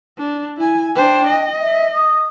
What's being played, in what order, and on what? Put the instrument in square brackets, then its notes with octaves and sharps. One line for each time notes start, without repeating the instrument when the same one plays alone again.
[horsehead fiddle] D4
E4 G#5
[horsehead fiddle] D4 C5 [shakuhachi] G5
[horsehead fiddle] D#5
[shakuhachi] E5
D#6